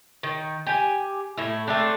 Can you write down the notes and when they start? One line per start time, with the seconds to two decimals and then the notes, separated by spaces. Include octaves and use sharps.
0.23 D#3
0.67 G4 G#5
1.37 A2 E4
1.67 A3 C4 D4